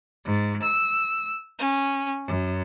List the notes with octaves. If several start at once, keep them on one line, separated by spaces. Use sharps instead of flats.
G#2
E6
C#4
F#2